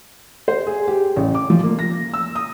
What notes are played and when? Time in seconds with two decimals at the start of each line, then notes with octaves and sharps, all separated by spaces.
0.48 C5
0.67 G#4
0.88 G4
1.16 A1
1.35 D6
1.50 F3
1.64 A#3
1.79 A#6
2.14 E6
2.35 D#6